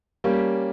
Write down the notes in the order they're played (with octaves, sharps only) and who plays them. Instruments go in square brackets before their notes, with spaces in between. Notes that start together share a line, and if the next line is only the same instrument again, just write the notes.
[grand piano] G3 A#3 C#4 G4